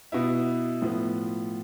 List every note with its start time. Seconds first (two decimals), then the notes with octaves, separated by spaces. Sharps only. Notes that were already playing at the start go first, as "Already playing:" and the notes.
0.12 B2 B3 E4
0.82 A2 F3 B3